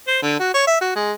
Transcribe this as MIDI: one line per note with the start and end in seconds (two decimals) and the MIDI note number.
0.08 0.20 72
0.23 0.39 50
0.40 0.53 66
0.54 0.67 73
0.67 0.77 76
0.81 0.94 66
0.95 1.12 56